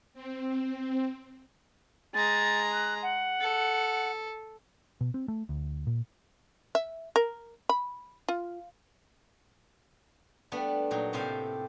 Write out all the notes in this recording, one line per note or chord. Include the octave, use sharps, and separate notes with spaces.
C4
G#3 A#5 A6
F#6
F#5
A4
B2
C4
A3
D2
A#2
E5
A#4
B5
F4
G3 A3 B3 D4
A#2 F#3 D#4
A2 C3 C4 G4 A4 F5